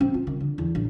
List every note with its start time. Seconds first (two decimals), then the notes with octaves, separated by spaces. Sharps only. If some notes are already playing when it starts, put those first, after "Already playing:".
0.01 C4
0.14 F4
0.27 D#3
0.40 D3
0.58 E2
0.75 A#1